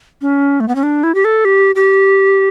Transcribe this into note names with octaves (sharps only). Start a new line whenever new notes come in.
C#4
A3
B3
C#4
D4
E4
G4
A4
G4
G4